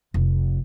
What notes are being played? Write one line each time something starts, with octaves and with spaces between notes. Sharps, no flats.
F1